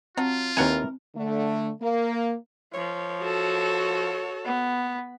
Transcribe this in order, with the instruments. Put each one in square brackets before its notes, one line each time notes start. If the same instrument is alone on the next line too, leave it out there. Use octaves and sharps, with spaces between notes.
[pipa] F#3 [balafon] C4 [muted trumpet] F4
[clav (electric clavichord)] D#2 F#5 G#5 [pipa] E3 A#4 [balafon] C4
[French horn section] D3 A3
A#3
[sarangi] F3 [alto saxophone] C#5
[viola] F#4 A4
[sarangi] B3